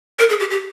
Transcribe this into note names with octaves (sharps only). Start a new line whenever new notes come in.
A#4
G#4
G4
G4